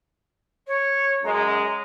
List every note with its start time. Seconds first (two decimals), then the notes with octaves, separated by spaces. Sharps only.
0.67 C#5
1.24 F#2 G#3 A#5